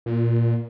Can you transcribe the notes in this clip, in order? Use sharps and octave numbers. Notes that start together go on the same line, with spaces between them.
A#2